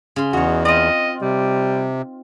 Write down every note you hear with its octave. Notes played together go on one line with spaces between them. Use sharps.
C#3 C6
E2 D#4 F#4 C#5
C4 F4 D#5
C3 G3